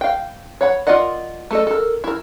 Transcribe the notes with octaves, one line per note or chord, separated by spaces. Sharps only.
F5 G5
C#5 F#5 B5
F4 A#4 D5 D#5 F#5
A3 A4 D#5
A4 A#4
E4 A#4